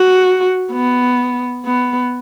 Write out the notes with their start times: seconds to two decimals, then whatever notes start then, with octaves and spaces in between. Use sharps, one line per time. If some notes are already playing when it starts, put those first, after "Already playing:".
Already playing: F#4
0.72 B3
1.65 B3